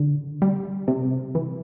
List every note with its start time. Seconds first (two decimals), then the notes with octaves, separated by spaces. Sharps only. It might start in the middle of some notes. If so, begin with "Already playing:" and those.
Already playing: D3
0.42 G3
0.88 C3
1.35 E3